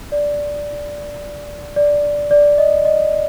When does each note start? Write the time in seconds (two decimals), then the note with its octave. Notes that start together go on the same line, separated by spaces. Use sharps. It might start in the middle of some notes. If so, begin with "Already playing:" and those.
0.12 D5
1.76 D5
2.31 D5
2.58 D#5
2.85 D#5